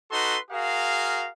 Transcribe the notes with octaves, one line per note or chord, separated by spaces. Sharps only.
D#4 F#4 A4 B4 C6
F#4 G#4 A#4 F5